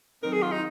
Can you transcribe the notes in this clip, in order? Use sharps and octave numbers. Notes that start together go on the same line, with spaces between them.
D#3 F#3 C4 D#4 A#4
G#4
F4
D#4